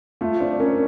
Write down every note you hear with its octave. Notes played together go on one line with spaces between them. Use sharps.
A3 F4
C4 D4
C#4 A#4